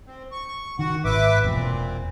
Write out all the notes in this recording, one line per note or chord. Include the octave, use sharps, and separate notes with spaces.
C4
C#6
D#3 F#4 F#5
G#1 B4 E5 D6
E1 A#2 C4